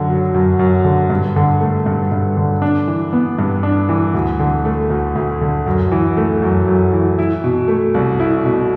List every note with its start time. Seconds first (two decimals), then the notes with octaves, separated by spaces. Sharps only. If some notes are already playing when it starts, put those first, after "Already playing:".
Already playing: F#2 D3
0.10 F#3
0.34 F#2
0.59 F#2
0.85 D3
1.10 G2
1.36 D3
1.61 A3
1.86 G2
2.12 G2
2.37 D3
2.62 D4
2.87 E3
3.13 B3
3.39 G2
3.63 D4
3.89 E3
4.14 D2
4.40 D3
4.65 A3
4.90 D2
5.15 D2
5.41 D3
5.66 F#2
5.91 E3
6.17 A3
6.42 F#2
6.68 F#2
6.93 E3
7.19 E4
7.44 B2
7.68 A3
7.94 C2
8.20 E4
8.45 B2